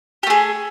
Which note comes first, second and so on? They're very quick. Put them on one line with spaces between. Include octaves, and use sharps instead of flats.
G4 A3 G#4